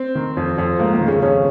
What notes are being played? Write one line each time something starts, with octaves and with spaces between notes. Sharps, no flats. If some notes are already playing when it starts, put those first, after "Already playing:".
Already playing: C4
D#3
F2
F2
G#2 A#3
A#3
D#3
C#3 C#4
F2 C#3 C#4